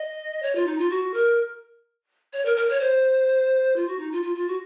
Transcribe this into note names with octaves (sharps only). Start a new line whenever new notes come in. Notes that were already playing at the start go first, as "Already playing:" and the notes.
Already playing: D#5
C#5
F4
D#4
F4
F#4
A#4
C#5
A#4
A#4
C#5
C5
F4
F#4
D#4
F4
F4
F4
F#4